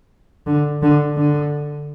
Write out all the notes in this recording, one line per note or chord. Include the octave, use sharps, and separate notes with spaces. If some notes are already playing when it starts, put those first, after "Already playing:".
D3
D3
D3